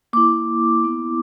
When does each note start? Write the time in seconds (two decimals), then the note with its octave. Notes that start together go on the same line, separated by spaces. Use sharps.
0.13 A#3 E4 D6
0.84 B3 E4